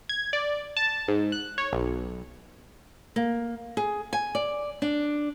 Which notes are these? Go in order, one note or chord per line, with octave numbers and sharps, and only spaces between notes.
G#6
D5
A5
G#2
F#6
C#5
B1
A#3
G#4
G#5
D5
D4